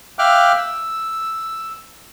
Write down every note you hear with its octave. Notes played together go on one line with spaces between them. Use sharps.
E5 F5 G5 D6 F6 F#6
E6